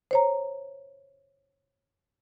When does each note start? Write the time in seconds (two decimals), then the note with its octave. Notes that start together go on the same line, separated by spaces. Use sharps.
0.11 C5 C#5 A#5